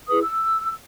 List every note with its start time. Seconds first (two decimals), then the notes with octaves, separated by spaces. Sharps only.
0.08 E4 G#4 B4 D#6
0.22 E6